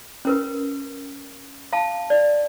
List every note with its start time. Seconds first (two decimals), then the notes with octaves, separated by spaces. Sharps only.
0.25 C#4 A#4 B4
1.73 F5 A5
2.10 D5